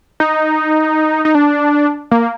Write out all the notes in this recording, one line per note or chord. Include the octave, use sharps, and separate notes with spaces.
D#4
D#4
D4
A#3